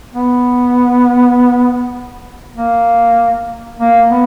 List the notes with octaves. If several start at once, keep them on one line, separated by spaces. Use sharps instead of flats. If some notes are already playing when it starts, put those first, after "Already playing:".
B3
A#3
A#3
B3